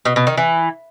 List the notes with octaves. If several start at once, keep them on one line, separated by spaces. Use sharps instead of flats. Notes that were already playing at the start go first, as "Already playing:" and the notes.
B2
B2
D#3
E3